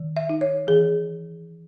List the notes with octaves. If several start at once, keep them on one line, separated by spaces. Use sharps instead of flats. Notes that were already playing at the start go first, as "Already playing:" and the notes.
Already playing: D#3
E5
D#4
C#5
E3 G#4